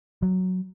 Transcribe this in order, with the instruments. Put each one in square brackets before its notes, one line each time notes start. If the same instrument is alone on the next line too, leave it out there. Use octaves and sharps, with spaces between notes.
[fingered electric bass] F#3